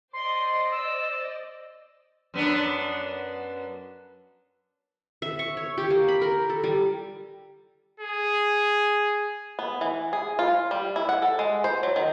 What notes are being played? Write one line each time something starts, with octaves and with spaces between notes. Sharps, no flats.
C5 D5 D#5 C6
E6
F#2 B3 D4
E5
C#6
C#5
G4
A#3
B5
A#4
A4
G3
G#4
B3
E3
G#4
F4
G3
E4
F#5
A4
G#3
C5
F#3
D#3